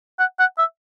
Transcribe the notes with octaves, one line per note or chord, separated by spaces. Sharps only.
F#5
F#5
E5